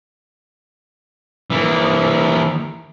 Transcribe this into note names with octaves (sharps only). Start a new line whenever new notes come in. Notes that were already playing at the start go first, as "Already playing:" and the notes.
E3 A#3